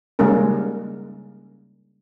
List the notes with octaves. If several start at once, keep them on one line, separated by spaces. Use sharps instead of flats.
C#3 G3 G#3 A#3 C#4 A#4